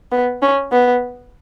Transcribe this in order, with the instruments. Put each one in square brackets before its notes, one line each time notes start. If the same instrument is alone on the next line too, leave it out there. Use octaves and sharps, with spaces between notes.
[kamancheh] B3
C#4
B3